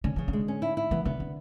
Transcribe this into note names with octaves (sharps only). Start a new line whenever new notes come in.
D3 C#4
C#3 E3
D3
G#3
C#4
E4
E4
E3 B3
D3 B3
D3